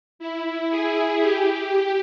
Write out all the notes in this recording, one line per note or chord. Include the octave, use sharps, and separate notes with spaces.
E4
G#4
G4
G4